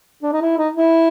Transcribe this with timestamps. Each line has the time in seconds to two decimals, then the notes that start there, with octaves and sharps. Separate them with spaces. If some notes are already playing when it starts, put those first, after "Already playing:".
0.23 D4
0.32 D#4
0.42 E4
0.58 D#4
0.74 E4